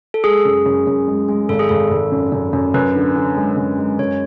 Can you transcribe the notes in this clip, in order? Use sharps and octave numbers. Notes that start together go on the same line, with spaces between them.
A4
G#3 G#4
F#2
F#2
F#2
G#3
G#3
G#1 A4
G#4
G#1 A4
G#1
F#2
F#2
F#2
F#2 B4
D3
D3
G#3
F#2
G#3
F#2 C#5